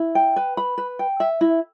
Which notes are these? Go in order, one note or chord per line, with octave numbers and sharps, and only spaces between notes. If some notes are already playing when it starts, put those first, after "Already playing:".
Already playing: E4
G5
B4
B5
B4
G5
E5
E4